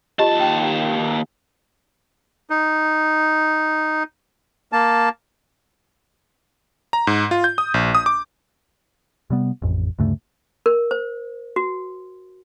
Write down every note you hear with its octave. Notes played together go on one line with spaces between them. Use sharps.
D#2 F4 G4 D#5 A5
G5
D#4
A#3 A5
A#5
G#2
F4
G6
D#6
A#1
D#6
D6
C3 G3 B3
A1 F2
D2 G2 C#3 A3
A#4
C5
F#4